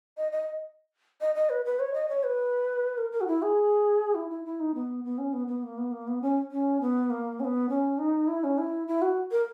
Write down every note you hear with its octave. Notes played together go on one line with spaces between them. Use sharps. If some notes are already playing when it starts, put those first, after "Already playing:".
D#5
D#5
D#5
D#5
B4
B4
C#5
D#5
C#5
B4
A#4
A#4
F#4
E4
G#4
E4
E4
E4
D#4
B3
B3
C#4
B3
B3
A#3
B3
A#3
B3
C#4
C#4
B3
A#3
C#4
B3
C#4
D#4
E4
C#4
E4
E4
F#4
A#4